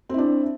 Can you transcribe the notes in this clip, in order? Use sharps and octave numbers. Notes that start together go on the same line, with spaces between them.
C4 D4 E4